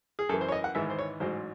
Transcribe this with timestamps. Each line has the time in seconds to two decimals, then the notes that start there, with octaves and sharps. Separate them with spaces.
0.19 G#4
0.29 F#2 A4
0.34 E3
0.41 C5
0.48 C#5
0.52 D#5
0.64 F#5
0.75 G#1 G#2 E3 E5
0.90 C5
0.99 C#5
1.20 A1 G#2 F#3 C5